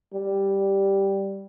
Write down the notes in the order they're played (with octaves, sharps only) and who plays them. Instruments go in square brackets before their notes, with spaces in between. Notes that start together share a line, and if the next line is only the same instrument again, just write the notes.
[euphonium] G3